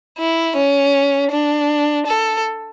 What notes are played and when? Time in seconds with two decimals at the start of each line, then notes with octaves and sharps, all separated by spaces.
0.18 E4
0.56 C#4
1.31 D4
2.06 A4